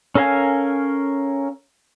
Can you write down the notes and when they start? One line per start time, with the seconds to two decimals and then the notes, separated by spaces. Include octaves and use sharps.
0.15 C#4 A4 A#4 F5 G#5